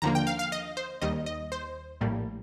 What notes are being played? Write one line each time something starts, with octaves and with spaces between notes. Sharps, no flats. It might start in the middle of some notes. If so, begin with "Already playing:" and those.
D#2 D3 F3 A#3 A#5
G5
F5
F5
D#5
C5
D#2 D#3 G3 D#5
D#5
C5
A#1 A2 G3 A#3